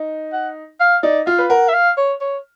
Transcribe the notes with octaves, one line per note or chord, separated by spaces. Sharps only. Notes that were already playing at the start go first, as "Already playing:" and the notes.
Already playing: D#4
F#5
F5
D#4 D5
F4 F5
B4
A#4 F#5
E5
F5
C#5
C#5